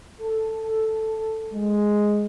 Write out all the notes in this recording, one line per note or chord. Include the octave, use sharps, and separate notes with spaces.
A4
G#3